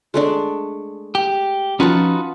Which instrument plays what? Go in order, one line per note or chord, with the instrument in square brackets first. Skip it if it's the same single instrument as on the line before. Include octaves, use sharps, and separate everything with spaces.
[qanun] G#3 A3 D4
[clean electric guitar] G4
[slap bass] F3 C#4 [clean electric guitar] D#4 F#4 B4 [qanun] F4 A5